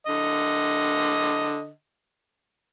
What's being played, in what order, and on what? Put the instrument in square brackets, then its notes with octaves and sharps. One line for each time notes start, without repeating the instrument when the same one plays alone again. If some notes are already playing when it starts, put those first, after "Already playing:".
[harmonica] D3 D#5